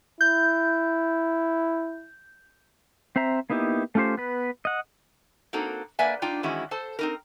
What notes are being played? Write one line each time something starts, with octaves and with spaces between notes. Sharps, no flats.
E4 G6
C4 C5 E5 A#5
A#3 B3 D#4 E4 G4
A3 C#4 F4 G4 C5
B3 B4
D#5 F#5
A#3 C4 D#4 F#4 A4
A#3 B4 D5 E5 F#5 G#5
D4 D#4 F4 G5
D#3 E3 G#3 C#4 E4 F#4
A4 C5 A5
C4 D#4 A#4